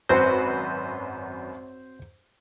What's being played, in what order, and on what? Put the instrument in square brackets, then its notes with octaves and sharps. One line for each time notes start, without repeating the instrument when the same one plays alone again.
[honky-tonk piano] G#1 F#2 B4 [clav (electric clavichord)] C4 F#4 [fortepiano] C5